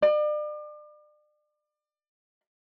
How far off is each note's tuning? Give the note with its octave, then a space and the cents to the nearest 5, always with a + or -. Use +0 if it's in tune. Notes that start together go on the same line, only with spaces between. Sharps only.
D5 +35